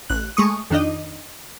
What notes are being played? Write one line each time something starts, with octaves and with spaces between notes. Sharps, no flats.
A1 F#6
G#3 A3 C#6 D#6
F2 D#3 D4 D#4 D#5